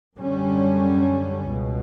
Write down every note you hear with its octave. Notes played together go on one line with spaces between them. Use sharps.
F#2 D3 G3 C#4
C#2 B2